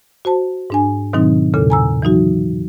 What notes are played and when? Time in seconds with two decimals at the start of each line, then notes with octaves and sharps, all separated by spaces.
0.25 F#4 C5 A5
0.70 G#2 D4 G#5
1.13 G#2 B2 D#3 F#3 C4 D#4
1.54 E2 A#2 C#3 A4
1.70 G#5 A#5 E6
2.02 E3 F#3 D#4 F#4